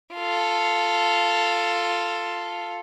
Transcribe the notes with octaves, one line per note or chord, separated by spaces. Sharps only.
F4 A4